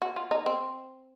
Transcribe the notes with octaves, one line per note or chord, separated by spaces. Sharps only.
F#4
F4
D#4
C4